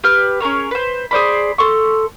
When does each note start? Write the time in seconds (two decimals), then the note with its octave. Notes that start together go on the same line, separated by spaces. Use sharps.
0.04 G4 B4 F6
0.40 C#4 G#4 A#4 C#5
0.71 B4 C5
1.11 G#4 C5 D5 B5
1.58 A4 C6 C#6